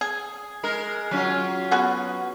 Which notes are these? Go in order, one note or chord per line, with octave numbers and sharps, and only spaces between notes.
G#4
G#3 A#4
F#3 C#4 F4
B3 F#4 G#4